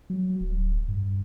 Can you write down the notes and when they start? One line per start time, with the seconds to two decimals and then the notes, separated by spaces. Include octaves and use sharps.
0.10 F#3
0.41 D1
0.88 G2